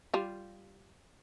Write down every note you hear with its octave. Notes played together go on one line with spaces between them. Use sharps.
G3 F4